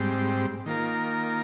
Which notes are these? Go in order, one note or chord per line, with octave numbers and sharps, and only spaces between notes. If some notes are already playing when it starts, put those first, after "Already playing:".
Already playing: G#2 G3 C4
D#3 A#3 F4 A#4